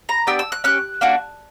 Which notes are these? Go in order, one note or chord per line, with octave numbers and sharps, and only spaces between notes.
A#5
B3 D4 G4 E6
E6
F#6
C#4 G4 F#6
A#3 D4 F#4